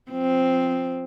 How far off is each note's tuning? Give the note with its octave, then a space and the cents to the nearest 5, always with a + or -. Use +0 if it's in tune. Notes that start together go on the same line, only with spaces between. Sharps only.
F3 +0 C4 +0